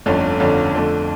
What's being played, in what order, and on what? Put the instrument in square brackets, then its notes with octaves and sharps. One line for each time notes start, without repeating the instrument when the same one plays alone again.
[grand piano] G1 F2 D3 A3 C#4
G1 F2 D3 A3 C#4
F2 D3 A3